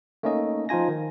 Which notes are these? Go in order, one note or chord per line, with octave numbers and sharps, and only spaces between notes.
A3 A#3 C#4 D#4 D#5
F3 D#4 F4 G#5 A#6
D#3